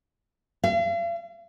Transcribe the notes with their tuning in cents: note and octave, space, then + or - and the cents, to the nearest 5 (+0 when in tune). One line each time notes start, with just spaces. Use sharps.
F5 -45